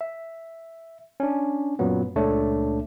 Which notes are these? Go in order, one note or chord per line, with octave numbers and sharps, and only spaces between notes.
E5
C#4 D4
F#2 A#2 F#3 B3
C#2 A#2 A3 D4 C#5